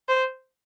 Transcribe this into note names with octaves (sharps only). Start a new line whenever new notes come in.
C5